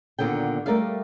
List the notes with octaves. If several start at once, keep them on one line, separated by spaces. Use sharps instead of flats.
D#2 A#2 D3 B3 G5
G3 A3 A#4 D5 E5 F5